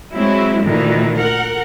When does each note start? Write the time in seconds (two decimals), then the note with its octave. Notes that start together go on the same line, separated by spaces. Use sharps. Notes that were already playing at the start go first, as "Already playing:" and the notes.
0.14 F#3 G#3 C4 E4
0.65 D2 A#2 D#3 E3
1.17 A#4 F#5